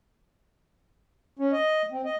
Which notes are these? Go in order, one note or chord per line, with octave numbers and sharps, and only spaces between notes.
C#4
D#5
C4
D#5